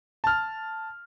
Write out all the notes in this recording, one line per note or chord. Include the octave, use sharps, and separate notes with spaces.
A5 F6